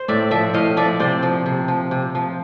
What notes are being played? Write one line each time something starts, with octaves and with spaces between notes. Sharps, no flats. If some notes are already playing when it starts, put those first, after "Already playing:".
Already playing: C5
A2 D5 E5
F3 D5 E5
A2 D#5 F5
F3 D5 E5
C3 C5 D5
F3
C3
F3
C3
F3